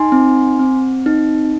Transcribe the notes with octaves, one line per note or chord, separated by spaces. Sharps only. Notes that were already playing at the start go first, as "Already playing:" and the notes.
Already playing: D#4 G#5 C6
C4
C4
D#4